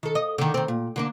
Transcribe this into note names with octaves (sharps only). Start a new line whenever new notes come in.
D#3 A4
D#5
D3 D#3
D#3 C4
A#2
D3 A#3 D4